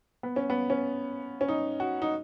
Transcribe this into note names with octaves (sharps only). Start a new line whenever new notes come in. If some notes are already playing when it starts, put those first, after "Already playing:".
B3
C#4
B3
C#4
C#4
D#4
F#4
D#4